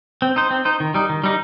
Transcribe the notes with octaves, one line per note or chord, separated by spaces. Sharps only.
C4
D#4 C5
C4
D#4 C5
D#3
G3 D#4
D#3
G3 D#4